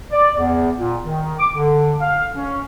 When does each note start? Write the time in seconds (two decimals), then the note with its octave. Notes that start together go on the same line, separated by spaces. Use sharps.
0.12 D5
0.39 E2
0.78 A#2
1.03 D#3
1.39 D6
1.56 D3
2.01 F5
2.34 C#4